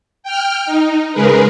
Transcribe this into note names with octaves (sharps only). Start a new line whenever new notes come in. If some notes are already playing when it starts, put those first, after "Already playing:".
G5 F6
D#4
C#3 G#3 G#4 A#4 B4